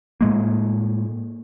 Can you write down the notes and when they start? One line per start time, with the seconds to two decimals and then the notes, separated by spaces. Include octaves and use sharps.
0.21 A2 G#3 A#3